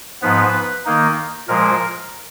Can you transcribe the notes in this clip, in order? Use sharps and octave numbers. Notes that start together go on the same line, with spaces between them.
G#2 F3 B3 B4
D#3 A#3 D#4
A#2 F3 G#3 A#4